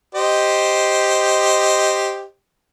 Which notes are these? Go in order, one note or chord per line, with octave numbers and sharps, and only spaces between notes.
G4 C5 D#5